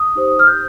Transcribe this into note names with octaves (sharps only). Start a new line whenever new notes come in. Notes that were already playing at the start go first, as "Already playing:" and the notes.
Already playing: D#6
D#4 G4 C5
F6
G6